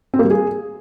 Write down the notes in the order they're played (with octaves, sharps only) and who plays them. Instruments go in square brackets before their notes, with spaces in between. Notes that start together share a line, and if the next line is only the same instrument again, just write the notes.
[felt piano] C4
A#3
G3
G#4